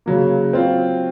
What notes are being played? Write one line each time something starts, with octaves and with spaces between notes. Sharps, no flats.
C#3 F#3 A#3
F#3 C4 F4